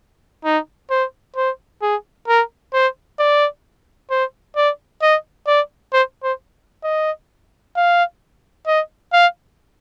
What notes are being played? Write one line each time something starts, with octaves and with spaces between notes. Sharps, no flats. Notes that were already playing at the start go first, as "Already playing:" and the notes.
D#4
C5
C5
G#4
A#4
C5
D5
C5
D5
D#5
D5
C5
C5
D#5
F5
D#5
F5